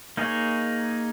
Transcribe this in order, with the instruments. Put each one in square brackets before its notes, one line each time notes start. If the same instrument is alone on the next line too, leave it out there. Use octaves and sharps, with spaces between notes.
[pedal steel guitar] A#3 D#4 G#4 C#5